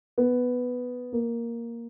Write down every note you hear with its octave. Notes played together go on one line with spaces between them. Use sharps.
B3
A#3